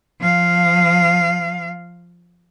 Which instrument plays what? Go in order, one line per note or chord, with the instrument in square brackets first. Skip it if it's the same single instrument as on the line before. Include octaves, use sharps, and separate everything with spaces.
[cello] F3 F5